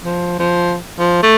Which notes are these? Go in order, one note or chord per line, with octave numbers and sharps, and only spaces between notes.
F3
F3
F3
A3